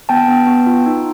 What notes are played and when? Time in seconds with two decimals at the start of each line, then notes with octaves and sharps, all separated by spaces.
0.09 B3 G5 A5
0.28 B3
0.47 B3
0.67 F4
0.86 D#4